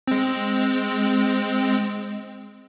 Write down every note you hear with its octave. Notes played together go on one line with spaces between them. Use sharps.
G#3 C4